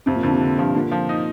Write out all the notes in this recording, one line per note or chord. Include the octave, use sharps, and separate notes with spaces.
F2 C3
A#2
F2 D3
C3
D3
G2 F3
A#2 D3
F3
D#4